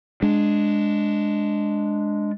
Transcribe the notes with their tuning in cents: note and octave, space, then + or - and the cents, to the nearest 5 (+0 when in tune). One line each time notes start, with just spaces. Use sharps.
G#3 +0 D4 +0